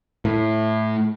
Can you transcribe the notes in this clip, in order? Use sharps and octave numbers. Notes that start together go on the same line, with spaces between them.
A2